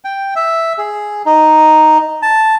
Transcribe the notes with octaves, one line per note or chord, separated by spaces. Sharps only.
G5
E5
G#4
D#4
A5